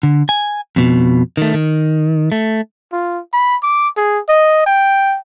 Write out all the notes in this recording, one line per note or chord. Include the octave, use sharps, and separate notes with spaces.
D3
G#5
F2 B2
D#3 A3
D#3
A3
F4
B5
D6
G#4
D#5
G5